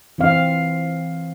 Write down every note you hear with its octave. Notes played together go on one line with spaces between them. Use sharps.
E3 C4 F5